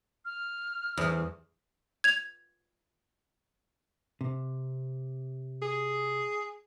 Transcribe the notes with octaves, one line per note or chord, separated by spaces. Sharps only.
F6
E2
G#6 F7
C3
G#4